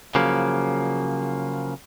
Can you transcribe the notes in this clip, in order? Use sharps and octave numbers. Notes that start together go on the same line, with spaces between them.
C#3 F3 F#3 A#3